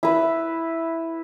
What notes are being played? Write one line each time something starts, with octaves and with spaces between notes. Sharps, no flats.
E4 B4